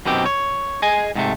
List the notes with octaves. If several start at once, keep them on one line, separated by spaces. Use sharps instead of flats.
F#2 B2 D#3 C4 G4
C#5
G#4 D#5 G#5
G#2 C3 A3